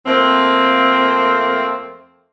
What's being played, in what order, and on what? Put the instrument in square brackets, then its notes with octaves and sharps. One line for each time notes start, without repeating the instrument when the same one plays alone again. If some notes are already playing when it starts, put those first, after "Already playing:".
[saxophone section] F2 A3 A#3 C4